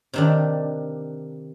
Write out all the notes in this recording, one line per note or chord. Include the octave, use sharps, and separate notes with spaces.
C3 D#3 D4